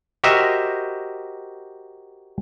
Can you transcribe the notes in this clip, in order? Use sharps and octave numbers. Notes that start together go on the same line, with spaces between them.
F#4 G4 A#4 C5 D#5 E5